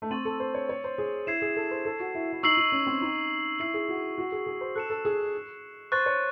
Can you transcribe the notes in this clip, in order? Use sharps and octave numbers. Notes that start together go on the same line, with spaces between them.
A3
C4 C#6 E6 A6 D#7 F#7
A4
C5
C#5
C#5
C5
G#4
E4 G#6 C7 E7
G#4
A4
C5
A4
F#4
E4
E4
D#4 C#6 E6 C7 F#7
D#4
C#4
C4
D#4
E4 E6 C7 F#7
G#4
F#4
F#4
G#4
G#4
C5
A4 F#6 C#7 E7
A4
G#4
C5 C#6 F#6 A6
C#5